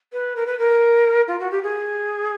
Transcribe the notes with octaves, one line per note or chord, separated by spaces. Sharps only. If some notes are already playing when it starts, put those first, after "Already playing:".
B4
A#4
B4
A#4
F4
F#4
G4
G#4